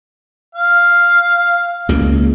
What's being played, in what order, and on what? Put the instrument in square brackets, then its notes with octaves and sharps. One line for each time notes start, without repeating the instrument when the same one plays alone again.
[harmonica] F5
[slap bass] C#2 C#3 A#3